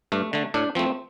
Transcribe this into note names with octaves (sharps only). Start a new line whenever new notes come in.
G2 A3
D3 A3
A2 D4
F3 A3 C4